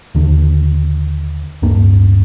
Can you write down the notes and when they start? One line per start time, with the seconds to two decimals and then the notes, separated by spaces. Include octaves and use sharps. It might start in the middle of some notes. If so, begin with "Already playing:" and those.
0.15 D#2 D3
1.62 D1 G2 A#3 D4